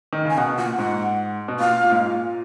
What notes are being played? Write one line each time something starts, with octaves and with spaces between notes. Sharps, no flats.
D#3
C#3
G#5
B2 F#5
A#2 F#5
G#2 F#5
B2
A#2 F5
A#2
G#2
A#2